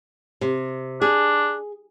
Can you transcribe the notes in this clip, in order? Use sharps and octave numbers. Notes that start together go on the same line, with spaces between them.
C3
D4 G#4